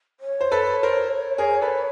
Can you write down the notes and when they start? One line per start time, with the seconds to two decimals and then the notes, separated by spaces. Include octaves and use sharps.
0.20 C#5
0.41 C5
0.52 A4 B4
0.83 A#4 C5
1.38 G#4 A#4
1.61 A4 B4